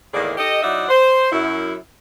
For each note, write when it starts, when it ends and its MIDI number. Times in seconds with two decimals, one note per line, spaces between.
0.13 0.33 40
0.13 0.33 45
0.13 0.33 51
0.13 0.33 58
0.13 0.33 68
0.13 0.33 74
0.38 0.59 63
0.38 0.59 67
0.38 0.59 69
0.38 0.59 75
0.63 0.86 54
0.63 0.86 63
0.63 0.86 64
0.63 0.86 74
0.63 0.86 76
0.63 0.86 78
0.88 1.31 72
1.32 1.74 42
1.32 1.74 64